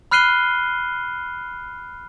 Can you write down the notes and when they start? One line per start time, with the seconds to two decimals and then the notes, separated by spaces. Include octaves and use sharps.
0.11 B5 F6 F#6 C7 D#7 G7